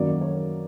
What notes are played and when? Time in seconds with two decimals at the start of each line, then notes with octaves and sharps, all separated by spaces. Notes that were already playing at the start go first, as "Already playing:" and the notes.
Already playing: F#2 D#3 F#3 A#3 D5
0.21 C#5